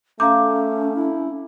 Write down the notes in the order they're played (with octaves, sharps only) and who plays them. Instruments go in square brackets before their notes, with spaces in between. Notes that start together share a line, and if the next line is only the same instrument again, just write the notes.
[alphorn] A3 [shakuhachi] C#4 [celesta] F5 A#5 G6 [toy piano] D6
[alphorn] E4